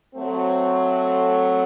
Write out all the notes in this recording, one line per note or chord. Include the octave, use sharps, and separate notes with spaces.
F#3 A3 C4